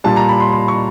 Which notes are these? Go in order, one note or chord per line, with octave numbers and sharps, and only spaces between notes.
A#2 G3 A5
A#5
B5
C6
C6
C#6